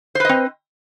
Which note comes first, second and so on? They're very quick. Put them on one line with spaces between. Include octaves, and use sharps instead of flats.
C5 B4 D#5 C4